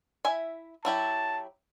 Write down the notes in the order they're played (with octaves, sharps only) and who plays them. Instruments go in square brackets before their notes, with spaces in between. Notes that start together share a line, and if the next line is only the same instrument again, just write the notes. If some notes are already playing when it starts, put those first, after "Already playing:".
[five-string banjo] E4 E5 G#5
[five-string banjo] F#3 E4 G4 [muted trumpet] A5